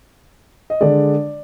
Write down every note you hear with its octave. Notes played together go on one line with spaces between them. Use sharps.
D#5
D3 G#3 D5